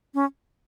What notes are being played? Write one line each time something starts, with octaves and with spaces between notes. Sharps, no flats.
C#4